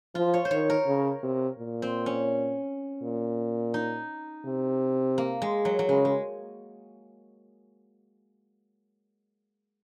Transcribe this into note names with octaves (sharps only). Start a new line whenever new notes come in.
F3 F4
C#5
C5
D#3 C#5
A#4
C#3
C3
A#2
C4
C#4
A#2
D#4
C3
A#3
G#3
F#3
F#3
C#3 G#3
G#3